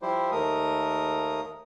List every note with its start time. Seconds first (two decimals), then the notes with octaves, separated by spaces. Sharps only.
0.02 F3 G3 E4 G4 C5
0.31 D#2 A3 A#4 D#6